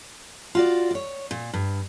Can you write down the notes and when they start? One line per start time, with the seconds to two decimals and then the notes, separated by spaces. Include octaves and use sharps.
0.55 F4 F#4 D5
0.91 C#5 D5
1.31 A#2
1.53 G2